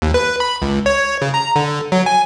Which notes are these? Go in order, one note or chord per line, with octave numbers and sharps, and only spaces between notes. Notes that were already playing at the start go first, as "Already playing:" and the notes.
D#2
B4
B5
C#2
C#5
C#3
A#5
D3
F#3
G#5